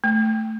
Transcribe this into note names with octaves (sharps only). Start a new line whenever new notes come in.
A3